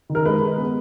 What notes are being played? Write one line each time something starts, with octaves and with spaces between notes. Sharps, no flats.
D#3
A#4
G#3 B4
G#3
B3